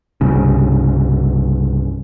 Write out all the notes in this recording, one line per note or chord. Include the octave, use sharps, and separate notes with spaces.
C2 G2 C#3